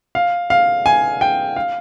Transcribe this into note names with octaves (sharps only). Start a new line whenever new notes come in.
F5
F5
G#5
G5
F5